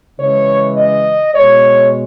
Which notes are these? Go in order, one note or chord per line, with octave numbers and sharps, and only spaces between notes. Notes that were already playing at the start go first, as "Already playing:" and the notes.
C#3 E3 G#3 C#5
D#5
B2 G#3 C#5